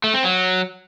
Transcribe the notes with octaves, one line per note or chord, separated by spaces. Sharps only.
A3
C4
F#3